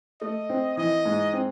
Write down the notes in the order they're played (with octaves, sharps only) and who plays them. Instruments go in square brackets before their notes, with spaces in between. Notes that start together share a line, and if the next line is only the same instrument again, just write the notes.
[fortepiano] A3 [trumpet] D#5
[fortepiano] C4
[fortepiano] E3 [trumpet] D#5
[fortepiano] G#2
C4